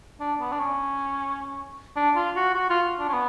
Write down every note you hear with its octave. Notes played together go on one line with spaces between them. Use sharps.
D4
B3
D4
C#4
D4
F4
F#4
F#4
F4
D4
C#4
B3